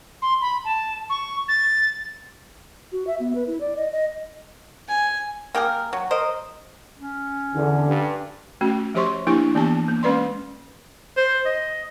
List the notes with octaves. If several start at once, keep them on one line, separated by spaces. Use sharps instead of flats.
C6
B5
A5
C#6
A6
F#4
E5
B3
B4
E4
D5
D#5
D#5
G#5
A#3 G4 G#4 A#4
F#3
A#4 C5 D#5
C#4
E2 D3
G2
A3 C#4 F#4
F3 G4 C5 C#5 C6 C#6
F3 A#3 D4 E4 G4 C#6
E3 A#3 B3 G4 A5
A#3
G#3 C#4 B4 D5 C6
C5
D#5